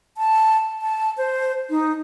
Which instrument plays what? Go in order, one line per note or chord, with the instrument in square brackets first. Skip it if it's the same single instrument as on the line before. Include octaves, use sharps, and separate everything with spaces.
[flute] A5
A5
C5
D#4